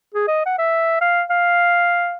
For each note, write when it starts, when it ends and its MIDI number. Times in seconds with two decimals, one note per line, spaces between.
0.14 0.28 68
0.28 0.45 75
0.46 0.56 78
0.58 0.98 76
1.01 1.22 77
1.30 2.18 77